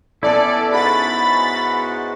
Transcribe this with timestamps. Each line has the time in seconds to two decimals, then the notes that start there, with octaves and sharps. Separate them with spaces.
0.23 B3 C#4 E4 A4 D5
0.72 G#2 F#4 B5 A6